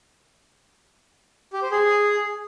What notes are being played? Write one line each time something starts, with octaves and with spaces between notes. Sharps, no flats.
G4
C5
G#4